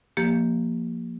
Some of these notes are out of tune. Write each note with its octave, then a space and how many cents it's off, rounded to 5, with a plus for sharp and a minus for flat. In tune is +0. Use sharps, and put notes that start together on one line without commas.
F3 +0 A#3 +0 G4 +0